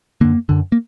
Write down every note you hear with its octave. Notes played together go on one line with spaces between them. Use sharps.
F#2 D3 A#3
F#2 D3
A#3